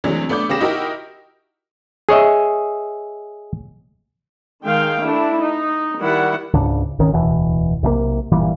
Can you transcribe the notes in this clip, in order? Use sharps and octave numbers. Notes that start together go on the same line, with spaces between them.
C3 E3 F#3 G#3 A3 D4
A3 B3 D4 D6 G6
C#3 B3 G4 G#4 A#6 E7
D#4 E4 F#4 G4 A#4 D#5
G#4 C#5 D#5 E5
D#3 G#3 F5 G5
A3 D4 E4
D#4
D#3 G3 E4 F#5
C#2 G#2 C#3 D4
G#1 D#3 C#4
D1 E2 B2 E3
B1 C3 G3 A#3
G1 A#2 E3 G3